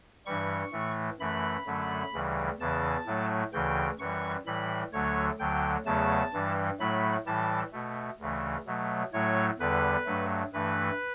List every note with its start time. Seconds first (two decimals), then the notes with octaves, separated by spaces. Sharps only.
0.26 G2 E3 G3 C#6
0.72 A2 E3 A3
1.20 F#2 E3 A3 B5
1.66 F#2 D3 F#3 A3
2.13 D2 C#3 E3 G3
2.60 E2 C#3 E3 A5
3.06 A2 F#3 A3
3.53 D2 C#3 E3 G5
3.99 F#2 E3 G3 C#6
4.46 A2 E3 G3 B5
4.93 D2 D3 F#3 A3 C#5
5.39 D2 D3 F#3 G5
5.86 E2 C#3 F#3 A3 A5
6.33 G2 E3 G3
6.79 A2 F#3 A3 B5
7.26 A2 E3 G3 A5
7.73 B2 A3
8.20 D2 C#3 E3 A3
8.66 B2 F#3 A3
9.13 A2 F#3 A3 C#5
9.59 E2 D3 G3 B4
10.06 G2 F#3 A3
10.53 G2 E3 A3 B4